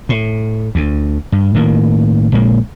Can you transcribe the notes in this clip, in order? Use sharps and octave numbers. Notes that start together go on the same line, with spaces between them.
A2
D2
G2
A2 D#3 G3 A#3
A#1 A#2 G#3 A#3